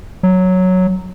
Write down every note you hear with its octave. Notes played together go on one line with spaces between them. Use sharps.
F#3